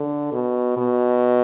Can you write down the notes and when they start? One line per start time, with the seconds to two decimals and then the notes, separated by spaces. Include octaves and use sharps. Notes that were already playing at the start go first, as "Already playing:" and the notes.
Already playing: D3
0.32 B2
0.77 B2